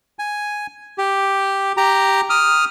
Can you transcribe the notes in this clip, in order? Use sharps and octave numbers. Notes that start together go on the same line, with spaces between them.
G#5
G4
G4 A#5
D#6 F6